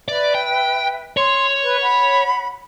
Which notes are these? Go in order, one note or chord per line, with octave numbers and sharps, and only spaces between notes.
B4 D5 E5
G5
C#5 C6
B4
F#5 B5